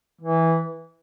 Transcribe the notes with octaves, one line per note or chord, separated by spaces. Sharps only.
E3